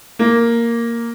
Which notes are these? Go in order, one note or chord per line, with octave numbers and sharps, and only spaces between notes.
A#3